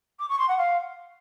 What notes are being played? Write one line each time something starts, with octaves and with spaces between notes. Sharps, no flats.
D6
C#6
C6
F#5
F5